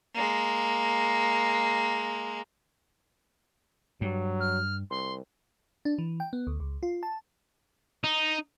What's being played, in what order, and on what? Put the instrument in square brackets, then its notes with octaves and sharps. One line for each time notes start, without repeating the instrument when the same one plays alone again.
[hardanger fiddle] G#3 A#3
[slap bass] G2 [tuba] F#3
[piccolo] F6
[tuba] C2 [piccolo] C6
[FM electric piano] D4
E3
G5
B3
D2
C#2
F4
A5
[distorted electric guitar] D#4